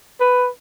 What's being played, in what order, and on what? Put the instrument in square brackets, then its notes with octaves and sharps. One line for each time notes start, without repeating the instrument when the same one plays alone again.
[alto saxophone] B4